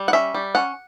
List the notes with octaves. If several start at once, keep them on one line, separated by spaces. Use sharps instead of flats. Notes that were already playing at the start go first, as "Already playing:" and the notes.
Already playing: G3
F#5
C#4 E5
G3
C#4 F#5